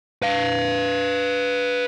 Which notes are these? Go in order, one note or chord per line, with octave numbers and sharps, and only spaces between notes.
B4 F5